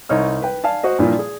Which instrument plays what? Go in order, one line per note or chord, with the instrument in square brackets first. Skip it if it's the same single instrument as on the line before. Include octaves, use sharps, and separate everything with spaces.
[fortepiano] C2 D#4 C#5 F6
B4 G5
D5 F5 G#5 A5
F#4 C5 D#5
G2 A#2 E3 F3
G#4